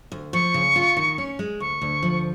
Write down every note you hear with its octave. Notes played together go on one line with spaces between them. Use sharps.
D2
F3 C#6
C#3
F4
D#3
C#4
G#3
D2 C#6
D2
F3